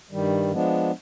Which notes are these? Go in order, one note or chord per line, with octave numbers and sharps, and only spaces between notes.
G2 D#3 G3
F3 G#3 B3 D4